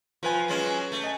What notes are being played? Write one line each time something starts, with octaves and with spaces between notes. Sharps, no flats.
F3 F4 B4 G#5
F#3 G#3 C#4
A3
D#5 G#5